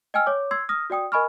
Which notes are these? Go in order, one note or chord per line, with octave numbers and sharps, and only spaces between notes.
D#5 G5 G#5 E6 F6
C#5 D6
C6 E6 G#6 C7
D#6 F6 A#6
F#4 D5 G5 D#6
A#4 D#5 G#5 B5 C#6 F6